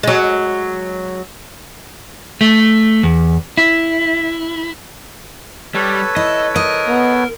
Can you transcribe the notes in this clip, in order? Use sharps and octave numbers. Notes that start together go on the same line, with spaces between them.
F#3 G#3
A3
E2
E4
G3 A4 B4 C#5
E4 D#5
A#4 D#5
B3